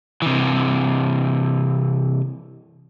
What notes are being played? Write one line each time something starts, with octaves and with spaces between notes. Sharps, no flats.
C3 E3